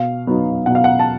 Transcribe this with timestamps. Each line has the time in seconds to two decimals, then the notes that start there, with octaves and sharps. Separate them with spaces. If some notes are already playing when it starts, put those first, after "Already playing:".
Already playing: B2 F5
0.27 F#3 B3 D#4
0.66 B2 F#5
0.75 F5
0.84 F#5
0.99 A5